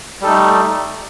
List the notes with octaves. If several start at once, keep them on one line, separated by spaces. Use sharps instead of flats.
G3 A3 D#4 A4